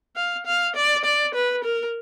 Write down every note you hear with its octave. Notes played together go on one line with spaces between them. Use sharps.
F5
F5
D5
D5
B4
A#4